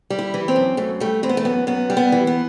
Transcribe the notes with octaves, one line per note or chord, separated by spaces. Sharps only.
G3
E4
E3
C4
F#2
F#2 A3
G3 A3
E3 C4
B3
A3
F#2 B3
F#2 B3
G3
B3
E3
B3